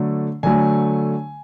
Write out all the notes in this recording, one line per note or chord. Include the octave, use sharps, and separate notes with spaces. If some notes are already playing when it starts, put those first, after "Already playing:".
Already playing: D3 F#3 A3
D3 F#3 A3 G#5